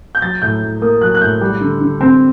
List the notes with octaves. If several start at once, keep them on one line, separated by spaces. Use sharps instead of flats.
G6
F#3 A6
A2 G6
A2
A#3 D#6
F#3 F#6
F#6
A2 G6
G3
D3
D3
C4